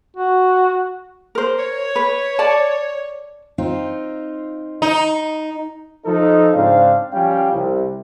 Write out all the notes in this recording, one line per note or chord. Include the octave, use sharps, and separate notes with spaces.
F#4
A#4 C5
C#5
B4
D5 A5
C4 D#4 F4
D#4
F3 D#4 A4
G#2 C#3 C4 D4 C5 F5
F3 G3 C#4 F5 G5
C2